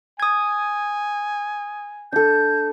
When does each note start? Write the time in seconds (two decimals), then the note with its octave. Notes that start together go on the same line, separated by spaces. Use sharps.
0.20 G#5 D#6 G#6
2.12 D4 A4 G6